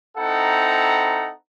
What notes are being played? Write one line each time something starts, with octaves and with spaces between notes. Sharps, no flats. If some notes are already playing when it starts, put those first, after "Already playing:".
C4 D#4 E4 A4 F#5 A#5